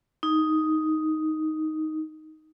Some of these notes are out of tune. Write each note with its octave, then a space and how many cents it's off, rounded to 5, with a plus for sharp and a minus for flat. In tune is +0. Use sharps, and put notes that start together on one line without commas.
D#4 +5